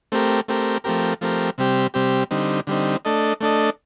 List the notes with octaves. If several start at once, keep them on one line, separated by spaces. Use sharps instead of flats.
A3 C4 G4 A#4
A3 C4 G4 A#4
F3 A3 C4 G4 A#4
F3 A3 C4 G4 A#4
C3 G3 C4 G4
C3 G3 C4 G4
D3 G3 C4 D#4
D3 G3 C4 D#4
A3 D4 A4 D#5
A3 D4 A4 D#5